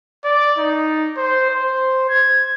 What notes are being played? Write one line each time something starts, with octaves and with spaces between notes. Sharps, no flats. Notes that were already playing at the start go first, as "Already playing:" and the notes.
D5
D#4
C5
C5
G#6